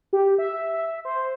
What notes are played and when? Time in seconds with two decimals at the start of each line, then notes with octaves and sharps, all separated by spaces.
0.13 G4
0.38 E5
1.05 C5